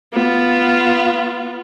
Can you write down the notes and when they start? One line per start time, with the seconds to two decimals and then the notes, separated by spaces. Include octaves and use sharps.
0.13 B3 F4